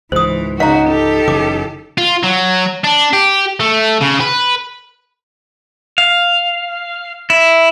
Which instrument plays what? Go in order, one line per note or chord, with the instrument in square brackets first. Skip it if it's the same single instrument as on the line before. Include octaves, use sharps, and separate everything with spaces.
[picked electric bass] C#2 G#2 [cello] E3 [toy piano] C5 D#6
[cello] C#3 F#4 [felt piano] D#4 [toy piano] F5 A#5
[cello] G4 A4
[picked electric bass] F#1 C#3 E3 [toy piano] D6
[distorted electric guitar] F4
F#3
D4
G4
A3
C#3
B4
[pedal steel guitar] F5
E4